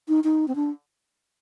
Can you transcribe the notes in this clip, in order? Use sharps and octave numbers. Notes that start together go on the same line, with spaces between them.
D#4
D#4
C4
D4